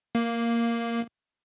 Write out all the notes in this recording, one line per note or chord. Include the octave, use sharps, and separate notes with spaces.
A#3